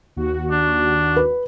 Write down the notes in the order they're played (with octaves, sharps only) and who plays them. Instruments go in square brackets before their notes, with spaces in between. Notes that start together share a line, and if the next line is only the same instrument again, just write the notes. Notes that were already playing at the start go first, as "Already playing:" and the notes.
[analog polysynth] D#2 F#4
[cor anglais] D4
[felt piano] B4